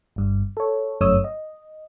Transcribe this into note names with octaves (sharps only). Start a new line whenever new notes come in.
G1 G2
A4 C#5
G1 F#2 A3 C#5 D#6 E6
D#5